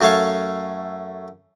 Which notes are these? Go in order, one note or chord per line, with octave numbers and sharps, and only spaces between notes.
F#2 A3 A4 C#5 F5 C#6